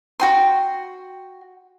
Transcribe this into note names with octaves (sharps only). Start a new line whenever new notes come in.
F#4 G5 C6